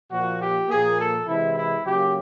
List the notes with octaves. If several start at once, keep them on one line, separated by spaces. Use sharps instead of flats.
A#2 F3 A#3 F#4
G4
A#2 F3 A#3 G#4
A4
C3 E3 G#3 E4
E4
C#3 F#3 A#3 G4